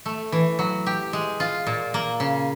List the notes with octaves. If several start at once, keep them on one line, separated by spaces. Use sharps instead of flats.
A3
E3
F#3
G4
G#3
F4
A#2
A#3
C#3